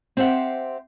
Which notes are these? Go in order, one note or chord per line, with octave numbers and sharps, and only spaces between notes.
C4 G4 C5 E5 F#5